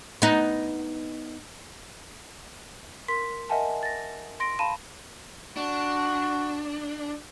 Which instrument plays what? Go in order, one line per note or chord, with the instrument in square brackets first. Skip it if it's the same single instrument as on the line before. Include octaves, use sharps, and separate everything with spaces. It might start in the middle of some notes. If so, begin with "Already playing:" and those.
[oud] B3 D#4
[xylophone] A#4 C6 B6
A#4 D#5 E5 F#5 G#5 A5
A6 A#6
C6 A#6 D7
F5 A5 B5 D#7 E7
[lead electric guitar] D4 [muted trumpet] F#4